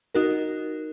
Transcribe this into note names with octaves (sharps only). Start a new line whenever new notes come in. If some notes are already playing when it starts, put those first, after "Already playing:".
D#4 F#4 A#4